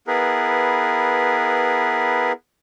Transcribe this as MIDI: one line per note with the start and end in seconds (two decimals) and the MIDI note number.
0.07 2.32 59
0.07 2.32 64
0.07 2.32 68
0.07 2.32 70
0.07 2.32 71